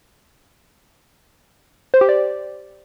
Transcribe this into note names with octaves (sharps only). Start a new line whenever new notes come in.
C5
G4
D5